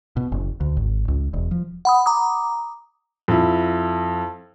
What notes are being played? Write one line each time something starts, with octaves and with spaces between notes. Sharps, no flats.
B2
F#1
D2
G#1
C#2
E1
F3
F#5 B5 D#6
A#5 D6 D#6
F2 E4